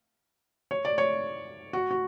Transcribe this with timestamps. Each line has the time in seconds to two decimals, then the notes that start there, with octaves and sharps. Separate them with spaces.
0.71 C#5
0.85 D5
0.98 C#5
1.73 F#4
1.91 F#4